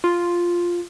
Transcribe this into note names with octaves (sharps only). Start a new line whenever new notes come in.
F4